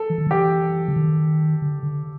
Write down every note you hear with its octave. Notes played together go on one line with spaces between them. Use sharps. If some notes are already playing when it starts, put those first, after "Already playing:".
Already playing: A4
E3
D#3
E3 G4
D3
D#3
D3
D3